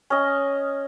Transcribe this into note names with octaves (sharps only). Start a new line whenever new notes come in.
C#4 D#5